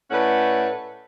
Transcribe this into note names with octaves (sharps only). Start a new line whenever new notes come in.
A2 A3 C#4 B4 D5 F#5